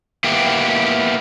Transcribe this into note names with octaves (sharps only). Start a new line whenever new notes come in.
A#3 B3 E4 G4